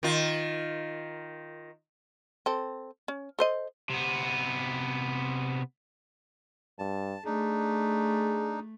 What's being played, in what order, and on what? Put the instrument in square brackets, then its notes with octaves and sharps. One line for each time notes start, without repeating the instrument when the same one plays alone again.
[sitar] D#3 F4
[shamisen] C4 A4
C#4
A4 C5 D#5
[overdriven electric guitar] C3 B3
[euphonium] G2 [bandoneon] A5
[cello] A3 [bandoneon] D4 D#4 [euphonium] G#4